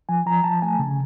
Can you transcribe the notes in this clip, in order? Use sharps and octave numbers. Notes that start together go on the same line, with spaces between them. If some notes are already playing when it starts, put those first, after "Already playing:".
F3 G#5
F3 A#5
F3 A5
A3 G#5
C#3